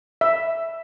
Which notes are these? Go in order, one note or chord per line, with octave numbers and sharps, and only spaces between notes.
E5